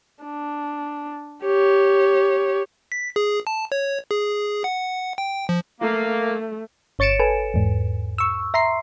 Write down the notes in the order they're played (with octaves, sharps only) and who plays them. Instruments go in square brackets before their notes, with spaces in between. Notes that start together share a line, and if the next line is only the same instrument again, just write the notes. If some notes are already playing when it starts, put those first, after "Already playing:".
[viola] D4
G4 C#5
[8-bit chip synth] B6
G#4
A5
C#5
G#4
F#5
G5
F3
[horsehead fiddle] A3 [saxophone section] A#3
[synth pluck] G1 C#5 A6 C#7 D7 E7
A4 B4 G#5
E2 G#2
C#6 E6
E5 A#5 C6 C7